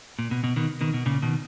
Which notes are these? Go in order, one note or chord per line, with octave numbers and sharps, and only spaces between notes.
A#2
B2
B2
B2 D#3
B2 D#3
B2
A#2 C#3
B2 D#3